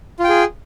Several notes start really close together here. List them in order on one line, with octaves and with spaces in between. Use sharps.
F4 G5 G#4